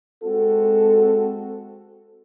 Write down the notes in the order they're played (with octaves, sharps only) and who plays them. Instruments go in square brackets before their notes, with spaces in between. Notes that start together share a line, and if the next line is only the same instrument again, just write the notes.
[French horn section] G#3 C4 F#4 A4